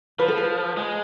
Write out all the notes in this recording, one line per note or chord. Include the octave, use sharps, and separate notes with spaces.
F3 B4
A4
B4
G#3